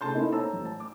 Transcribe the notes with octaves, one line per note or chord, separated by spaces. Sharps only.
C#3 A3 A5 C6 G6
A#3 B3 C#4 D#4 E4 A4
A4 C5 C#5 A5 A#5 E6
A1
A5
D6